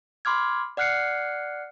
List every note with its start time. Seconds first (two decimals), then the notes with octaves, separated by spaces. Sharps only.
0.25 B5 C6 D6 F6 G#6
0.77 D5 F#5 F6 F#6 C7 C#7